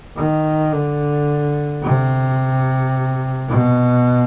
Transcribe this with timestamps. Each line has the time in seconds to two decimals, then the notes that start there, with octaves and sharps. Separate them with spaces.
0.16 D#3
0.72 D3
1.82 C3
3.49 B2